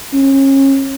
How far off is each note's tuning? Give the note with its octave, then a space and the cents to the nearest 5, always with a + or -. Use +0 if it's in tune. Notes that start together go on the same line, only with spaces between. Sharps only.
C#4 -30